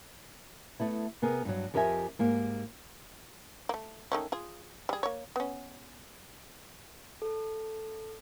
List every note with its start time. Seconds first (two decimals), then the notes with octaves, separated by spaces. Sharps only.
0.80 A3 B3 E4
1.22 C3 B3 G#4 A#4
1.45 G2 F#3
1.74 F2 G4 A#4 D#5 E5 G#5
2.19 G#2 A#3 G4
3.69 A3 A#3
4.12 D#3 A3 C#4
4.32 F4 G#4
4.89 G3 G#4
5.03 A#3 C#5
5.36 B3 C#4
7.22 A4